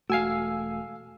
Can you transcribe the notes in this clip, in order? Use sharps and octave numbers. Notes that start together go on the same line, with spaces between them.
E1 A3 F#4 F5 G#5 E6 C7